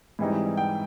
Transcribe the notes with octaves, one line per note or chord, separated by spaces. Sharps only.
G#2 E3 G3 C4 D#4
G5